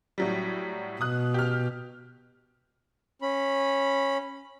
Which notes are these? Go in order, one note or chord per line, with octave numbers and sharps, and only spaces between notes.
A2 F#3 G3
B2 D#6 F#6
G4 F6
C#4 B5